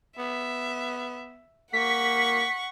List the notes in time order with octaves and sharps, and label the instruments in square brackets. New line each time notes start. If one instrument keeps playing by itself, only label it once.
[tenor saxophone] B3 [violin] E5
[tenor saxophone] A#3 [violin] F#5 C#6 [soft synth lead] B6